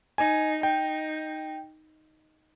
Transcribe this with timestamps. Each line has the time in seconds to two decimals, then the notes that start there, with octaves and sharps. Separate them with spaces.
0.18 D#4 G#5
0.63 D#4 G5